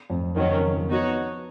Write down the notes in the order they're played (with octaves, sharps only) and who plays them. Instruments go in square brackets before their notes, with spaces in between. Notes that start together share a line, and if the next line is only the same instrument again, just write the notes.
[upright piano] F2
[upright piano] F2 [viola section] D#3 F#3 C#4
[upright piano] C#3
D#3
F3
[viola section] B3 D#4 F#4 C#5